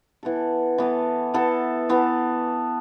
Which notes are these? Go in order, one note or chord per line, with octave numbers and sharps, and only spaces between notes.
E3 B3 A4
E3 B3 A4
E3 B3 A4
E3 B3 A4